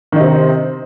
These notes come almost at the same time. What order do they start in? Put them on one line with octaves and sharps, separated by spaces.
D#3 D#4 C3 C4